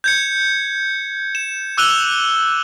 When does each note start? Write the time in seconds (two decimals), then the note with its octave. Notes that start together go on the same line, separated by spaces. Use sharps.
0.04 G6 G#6 C#7
1.35 E7
1.77 D6 E6 F#6 D#7 F7 G7